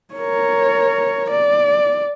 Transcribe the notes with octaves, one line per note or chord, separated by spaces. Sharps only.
A#4 C#5
D5